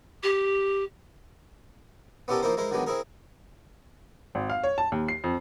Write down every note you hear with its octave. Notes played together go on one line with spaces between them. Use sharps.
G4
B3 C#4 E4 G4 A4 A#4
F3 A#3 D#4 E4 A#4 C5
G#3 E4 A#4 C5
D3 D#3 F#3 G#3 B3 D4
C4 E4 G#4 A#4
G#1
F5
C#5
A5
D#2
C7
F2